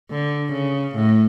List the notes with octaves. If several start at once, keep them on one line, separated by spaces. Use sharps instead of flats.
D3
C#3
A2